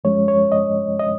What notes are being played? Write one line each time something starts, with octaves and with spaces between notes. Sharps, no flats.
F#2 F3 G#3 C#4 C#5
C#5
D#5
D#5